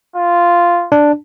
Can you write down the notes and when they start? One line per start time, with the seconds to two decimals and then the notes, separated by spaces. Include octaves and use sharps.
0.16 F4
0.92 D4